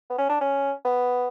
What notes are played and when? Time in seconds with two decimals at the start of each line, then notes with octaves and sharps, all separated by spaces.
0.10 B3
0.18 C#4
0.29 D4
0.41 C#4
0.85 B3